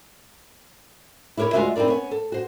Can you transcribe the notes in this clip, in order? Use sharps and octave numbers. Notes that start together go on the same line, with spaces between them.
E4 G4 A#4 C5 C#5
D2 G#3 F4 F#4 D#5 E5
C4 D#4 E4 A#4 D5
B3 C#4
A4
F#4 C5